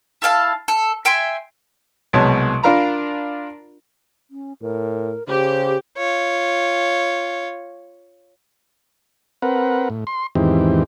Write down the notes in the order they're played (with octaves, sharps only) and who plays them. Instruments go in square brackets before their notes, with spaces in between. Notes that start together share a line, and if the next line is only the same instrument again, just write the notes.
[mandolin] E4 A4 F5 A5
A4
E5 G5 G#5 C6
[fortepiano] C2 B2 F#3 G#3 C#5 A5
D4 F4 A#4 F5 A#5 B5
[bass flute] C#4
[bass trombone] A2 [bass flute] A#4
[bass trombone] C#3 [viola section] G4 [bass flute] C5
[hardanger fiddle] F4 C#5
[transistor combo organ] C4 A#4 B4 F#5
A2
C6
E2 G#2 D#3 E3 C4 G4